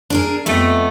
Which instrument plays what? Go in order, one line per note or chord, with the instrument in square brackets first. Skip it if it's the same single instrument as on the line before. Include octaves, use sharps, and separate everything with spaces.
[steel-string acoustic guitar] D4 G#4 A#4
[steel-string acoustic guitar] F2 B3 D#5 [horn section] A3